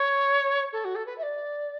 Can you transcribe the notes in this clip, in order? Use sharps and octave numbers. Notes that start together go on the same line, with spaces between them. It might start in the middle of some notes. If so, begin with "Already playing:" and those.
Already playing: C#5
A4
F#4
A4
B4
E5
D5